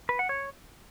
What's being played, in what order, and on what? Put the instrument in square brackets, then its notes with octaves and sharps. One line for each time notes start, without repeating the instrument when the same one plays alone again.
[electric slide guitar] B4
F#5
C#5